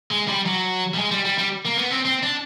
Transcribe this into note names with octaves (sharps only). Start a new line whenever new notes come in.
G#3
G3
F#3
G3
G#3
G3
G3
G3
A#3
B3
C4
C4
D4